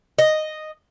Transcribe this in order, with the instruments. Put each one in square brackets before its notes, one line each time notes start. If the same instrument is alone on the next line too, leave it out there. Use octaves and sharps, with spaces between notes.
[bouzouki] D#5